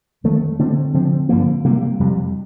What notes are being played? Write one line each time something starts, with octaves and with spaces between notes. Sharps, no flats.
F2 D#3 A3
D3 A3 C4
D3 F3 C4
G2 D3 F3 A#3
C3 G3 A#3
F2 C3 G3